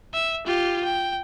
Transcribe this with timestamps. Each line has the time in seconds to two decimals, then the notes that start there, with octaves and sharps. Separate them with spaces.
0.14 E5
0.46 F4 G4
0.84 G5